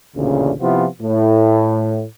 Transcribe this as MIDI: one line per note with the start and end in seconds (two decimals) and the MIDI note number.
0.17 0.52 33
0.17 0.52 38
0.17 0.52 46
0.17 0.52 49
0.61 0.86 48
0.61 0.86 53
0.61 0.86 59
0.61 0.86 64
0.61 0.86 65
1.01 2.04 45